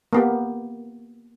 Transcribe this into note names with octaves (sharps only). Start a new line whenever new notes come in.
A#3 B3 G4